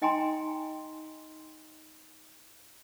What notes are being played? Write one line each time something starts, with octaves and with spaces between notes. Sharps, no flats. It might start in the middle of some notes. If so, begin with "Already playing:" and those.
D#4 D#5 G5 G#5 A#5 C6